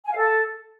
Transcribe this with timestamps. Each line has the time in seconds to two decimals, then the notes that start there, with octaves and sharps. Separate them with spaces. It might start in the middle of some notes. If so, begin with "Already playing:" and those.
0.04 G#5
0.10 F5
0.16 A4